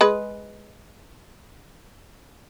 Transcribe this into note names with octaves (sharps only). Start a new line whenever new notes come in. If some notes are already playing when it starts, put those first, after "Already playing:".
G#3 B4